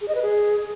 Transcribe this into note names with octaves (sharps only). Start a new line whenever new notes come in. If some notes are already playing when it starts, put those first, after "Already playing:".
G#4
D#5
B4
G#4